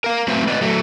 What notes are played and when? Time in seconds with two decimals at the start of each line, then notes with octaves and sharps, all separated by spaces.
0.04 A#4 F5
0.28 F#3 A3 C4 B4 C5 E5
0.48 B4 D5 D#5
0.61 F#3 A3